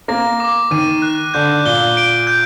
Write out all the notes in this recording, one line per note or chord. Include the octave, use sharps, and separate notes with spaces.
A#3 A#6
D6
D#3 D#7
F#6
D3 G6
A#2 G7
D7
G6